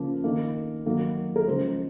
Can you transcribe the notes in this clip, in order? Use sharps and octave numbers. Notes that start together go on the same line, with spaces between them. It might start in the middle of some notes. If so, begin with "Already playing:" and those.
Already playing: C#3 F3 A#3
D#3 A#3
D#3 F#3 A#3
A#4
C#3 F3 G#3 C5